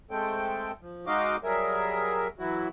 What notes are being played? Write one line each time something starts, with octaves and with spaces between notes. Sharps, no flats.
G#3 A3 C4 A4 G5
F3
G#3 D#4 F#4 D#5 F5 D6
F#3 G3 G#4 A#4 E5
E3 F#3 E4 F#4